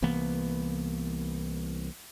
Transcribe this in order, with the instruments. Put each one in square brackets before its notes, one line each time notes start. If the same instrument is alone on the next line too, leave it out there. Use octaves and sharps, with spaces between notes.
[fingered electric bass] C2 E3 A#3 B3